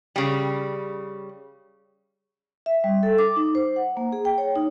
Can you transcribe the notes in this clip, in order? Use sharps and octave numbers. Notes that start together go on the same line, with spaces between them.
C#3 G3
E5
G3
A4
D6
D#4
C5
F#5
A#3
G#4
G5
C#5
D#4